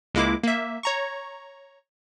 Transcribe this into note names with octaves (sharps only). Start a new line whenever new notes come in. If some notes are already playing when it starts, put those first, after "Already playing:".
C#2 G#3 A#3 E4 D6
A#3 E5
C#5 A#5 C#6